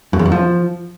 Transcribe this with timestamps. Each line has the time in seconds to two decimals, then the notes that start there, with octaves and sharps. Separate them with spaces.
0.13 F#2
0.19 E2
0.26 F#2
0.32 F3